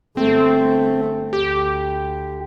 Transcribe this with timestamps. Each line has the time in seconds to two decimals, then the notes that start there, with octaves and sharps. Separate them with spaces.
0.17 G1 A3 C4
1.33 D2 G4